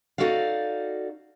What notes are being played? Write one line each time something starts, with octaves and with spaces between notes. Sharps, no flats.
D#4 E4 F#4 A4 D5 F5